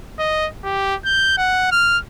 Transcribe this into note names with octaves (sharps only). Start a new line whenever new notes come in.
D#5
G4
G6
F#5
F6